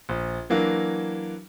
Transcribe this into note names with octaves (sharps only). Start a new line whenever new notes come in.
A#1
E3 F#3 A#3 D4